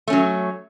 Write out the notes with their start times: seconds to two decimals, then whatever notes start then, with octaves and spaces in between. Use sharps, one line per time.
0.08 A3
0.10 C#4
0.13 F#3